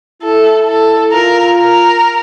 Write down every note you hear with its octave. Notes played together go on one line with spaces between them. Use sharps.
E4 A4
A4
F4 A#4
A#4